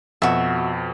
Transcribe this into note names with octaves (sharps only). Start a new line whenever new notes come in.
F2 B2 F#4 E5